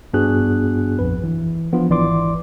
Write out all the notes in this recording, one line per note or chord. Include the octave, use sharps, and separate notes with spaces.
G2 B3 D4 F#4 G#4 F#6
A#1 F2 B4
E3
F3 B3 D4 F4
G#1 E3 D5 C6 D6